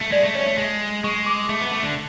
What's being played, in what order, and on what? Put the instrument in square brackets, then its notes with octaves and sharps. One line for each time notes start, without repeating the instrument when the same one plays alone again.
[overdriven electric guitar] A3
[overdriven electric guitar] G#3 [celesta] D5
[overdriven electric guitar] A3
[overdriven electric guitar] C#4 [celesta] C#5
[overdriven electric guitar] A3
G#3
[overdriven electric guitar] G#3 [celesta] C#6
[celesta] D6
[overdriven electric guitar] A3 [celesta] D6
[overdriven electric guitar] B3
A3
D3